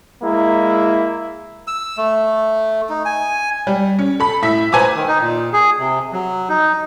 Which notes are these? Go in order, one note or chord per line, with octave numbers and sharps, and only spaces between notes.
G#3 A#3 E4
E6
A3
D#4
G#5
G3
C#4
A4 B5
A2 E5 B6
B4 C5 G#5 A#5 D6 E6
D#3
D#4
A#2
G#4
C3
F#3
D#4